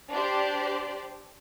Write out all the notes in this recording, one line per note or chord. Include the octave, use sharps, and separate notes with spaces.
D4 G4 C5 D5